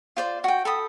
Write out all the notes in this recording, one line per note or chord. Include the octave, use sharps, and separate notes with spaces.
F4 C5 D5
F#4 G5
A4 B5 D#6